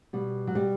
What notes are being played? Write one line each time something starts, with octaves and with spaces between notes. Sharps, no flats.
B2 G3
F#3
B2 G3